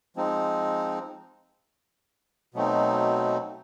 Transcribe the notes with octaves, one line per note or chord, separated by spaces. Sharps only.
F3 G#3 C4 D#4
B2 F#3 A3 C4 D#4